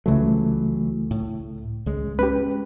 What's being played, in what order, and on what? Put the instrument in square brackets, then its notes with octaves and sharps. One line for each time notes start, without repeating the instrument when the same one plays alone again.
[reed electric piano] C#2 A3 [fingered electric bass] E3 F#3
[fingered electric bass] A2
C#2 G#3
[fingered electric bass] G#3 C#4 [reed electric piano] G4 B4